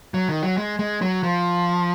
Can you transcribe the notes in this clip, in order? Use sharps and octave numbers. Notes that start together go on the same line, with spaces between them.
F#3
D#3
F#3
G#3
G#3
F#3
F3